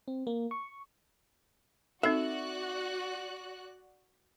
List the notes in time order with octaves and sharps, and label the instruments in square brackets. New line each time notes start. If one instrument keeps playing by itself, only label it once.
[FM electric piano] C4
A#3
C#6
[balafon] C4 D#4 A4 [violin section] F#4 D5 F#6 [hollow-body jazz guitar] E5